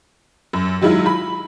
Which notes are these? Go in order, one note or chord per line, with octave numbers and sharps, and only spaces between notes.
F#2
D#3 F#3 G#3 E4 F4
B5